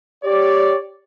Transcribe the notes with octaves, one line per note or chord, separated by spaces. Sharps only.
G4 C#5 D5